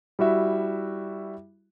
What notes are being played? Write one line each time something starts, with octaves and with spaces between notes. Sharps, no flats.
G3 E4 F#4 E5